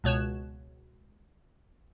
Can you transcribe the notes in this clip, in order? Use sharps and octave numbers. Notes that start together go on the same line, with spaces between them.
C#2 B2 C#5 F#6 E7